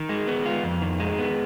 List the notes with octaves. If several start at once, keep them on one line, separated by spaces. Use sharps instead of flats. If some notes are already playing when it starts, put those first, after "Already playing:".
Already playing: D#3
G#3
B3
F4
F2
D#3
G#3
B3